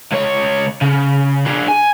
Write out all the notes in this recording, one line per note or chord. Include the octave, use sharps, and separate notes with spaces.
C#2 C#5
C#3
D4 G#4
G#5